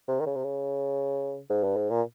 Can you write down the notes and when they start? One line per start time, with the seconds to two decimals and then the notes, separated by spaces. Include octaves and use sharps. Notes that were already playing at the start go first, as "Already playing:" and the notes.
0.08 C3
0.20 D#3
0.26 C#3
0.36 C3
0.44 C#3
1.50 G#2
1.64 G2
1.77 G#2
1.90 A#2